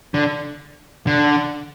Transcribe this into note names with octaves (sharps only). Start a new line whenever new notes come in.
D3
D3